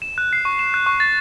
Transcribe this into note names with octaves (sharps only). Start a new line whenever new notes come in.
E7
F#6
C7
C#6
E7
F#6
C#6
A6